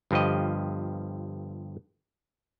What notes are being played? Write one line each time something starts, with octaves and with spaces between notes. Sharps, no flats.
G1 G2 F3 G4 D#5